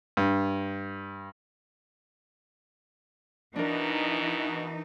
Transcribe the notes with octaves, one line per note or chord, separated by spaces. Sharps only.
G2
B2 E3 D4 D#4 A#4